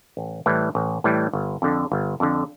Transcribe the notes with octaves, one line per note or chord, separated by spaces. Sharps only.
A1
A2 E3 G3
A1
A2 E3 G3
G1
F2 D3
G1
F2 D3